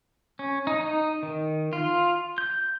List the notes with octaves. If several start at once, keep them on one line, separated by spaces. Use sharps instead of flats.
C#4
D#4
D#4
D#3
F4
G6